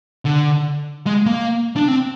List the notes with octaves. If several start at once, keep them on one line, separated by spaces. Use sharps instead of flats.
D3
G#3
A#3
D4
C4